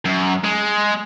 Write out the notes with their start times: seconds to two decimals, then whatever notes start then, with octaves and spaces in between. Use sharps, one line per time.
0.05 F#2
0.44 G#3